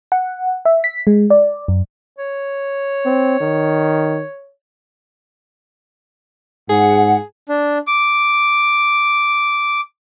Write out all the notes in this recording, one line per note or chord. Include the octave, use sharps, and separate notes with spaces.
F#5
E5
B6
G#3
D5
F#2
C#5
C4
D#3
G#2 G#4 F#5
D4
D6